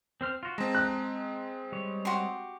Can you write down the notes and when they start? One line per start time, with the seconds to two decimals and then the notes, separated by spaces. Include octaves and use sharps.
0.21 C4 C5 F6
0.43 F4 F#4
0.58 G#3 C4 A5 A#5
0.74 F#6
1.72 G3 C#5
2.05 F#4 G4 C6